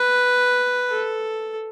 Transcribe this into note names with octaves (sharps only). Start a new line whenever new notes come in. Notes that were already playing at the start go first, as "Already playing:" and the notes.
Already playing: B4
A4